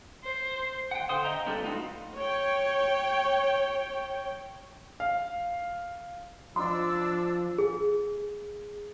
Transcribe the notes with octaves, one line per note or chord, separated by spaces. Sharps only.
C5
F#5 G5
D3 C5 F5 C6 D#6
D#5 E5 G5 A#5
G3 B3 D4 F4 A4
A3 D#4 F4 F#4 B4
C#5 G5
F5
F3 D4 D#5 C6 E6
G#4